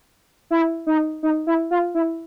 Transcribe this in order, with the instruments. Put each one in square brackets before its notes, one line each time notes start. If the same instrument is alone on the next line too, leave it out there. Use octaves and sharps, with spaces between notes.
[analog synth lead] E4
D#4
D#4
E4
F4
E4